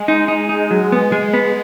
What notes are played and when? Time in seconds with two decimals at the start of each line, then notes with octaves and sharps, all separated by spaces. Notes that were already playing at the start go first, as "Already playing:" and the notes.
Already playing: G#3
0.08 D#4
0.28 D#4
0.49 D#4
0.71 F#3
0.92 B3
1.12 G#3
1.33 B3